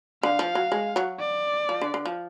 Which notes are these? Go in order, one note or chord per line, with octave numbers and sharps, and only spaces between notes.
D3 F5
F3
F#3
G#3
F#3
D5
F3
D3
D3
F3